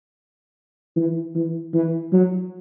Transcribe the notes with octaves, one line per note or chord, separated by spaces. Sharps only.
E3
E3
E3
F#3